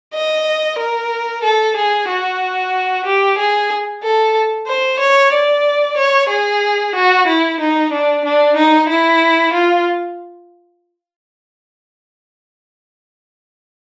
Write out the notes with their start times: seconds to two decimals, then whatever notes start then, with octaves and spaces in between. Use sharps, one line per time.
0.14 D#5
0.78 A#4
1.43 A4
1.76 G#4
2.08 F#4
3.06 G4
3.38 G#4
4.03 A4
4.67 C5
4.99 C#5
5.33 D5
5.97 C#5
6.29 G#4
6.95 F#4
7.27 E4
7.60 D#4
7.92 D4
8.25 D4
8.56 D#4
8.89 E4
9.53 F4